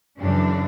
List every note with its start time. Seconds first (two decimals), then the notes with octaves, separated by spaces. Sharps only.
0.19 F#2 C#3 E3 D4